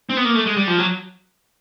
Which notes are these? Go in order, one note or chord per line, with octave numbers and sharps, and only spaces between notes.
C4
B3
A#3
A3
G#3
G3
F3
F#3